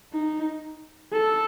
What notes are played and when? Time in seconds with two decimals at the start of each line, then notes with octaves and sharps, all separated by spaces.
0.13 D#4
1.12 A4